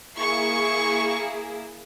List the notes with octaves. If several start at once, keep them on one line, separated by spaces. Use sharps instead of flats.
A#3 E4 G#4 C#6